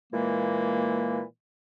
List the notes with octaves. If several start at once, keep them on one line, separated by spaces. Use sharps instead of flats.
A#2 E3 G#3 A#3